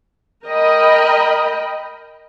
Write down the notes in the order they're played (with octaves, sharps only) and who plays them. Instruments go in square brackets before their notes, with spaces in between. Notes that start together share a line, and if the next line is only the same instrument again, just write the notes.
[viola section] A#4 D#5 G5 B5